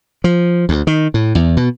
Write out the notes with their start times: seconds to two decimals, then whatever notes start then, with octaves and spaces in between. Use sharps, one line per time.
0.24 F3
0.69 D2
0.87 D#3
1.14 A2
1.35 E2
1.57 B2